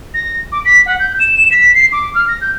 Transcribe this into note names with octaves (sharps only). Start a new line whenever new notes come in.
A#6
D6
B6
F#5
G6
E7
B6
C7
D6
F6
A#6
G6